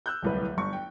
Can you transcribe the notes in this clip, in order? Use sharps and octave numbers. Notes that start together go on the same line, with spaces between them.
E6 F#6 G6
D1 C2 B4
G1 C#6
G5